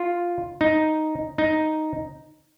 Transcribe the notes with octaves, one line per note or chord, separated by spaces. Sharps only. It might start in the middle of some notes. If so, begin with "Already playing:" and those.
Already playing: F4
D#4
D#4